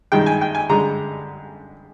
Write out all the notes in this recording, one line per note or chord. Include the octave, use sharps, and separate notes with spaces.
G2 D#3 G#3 G5
G#5
G5
G#5
G2 D3 G#3 A#5